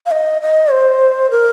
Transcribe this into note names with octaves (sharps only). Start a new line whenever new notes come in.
F5
D#5
D#5
C5
A#4